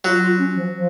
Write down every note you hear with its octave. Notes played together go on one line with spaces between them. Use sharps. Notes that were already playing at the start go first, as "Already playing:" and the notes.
F#3 F4
F4
C#4
F3
F3